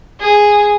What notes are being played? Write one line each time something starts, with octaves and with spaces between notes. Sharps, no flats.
G#4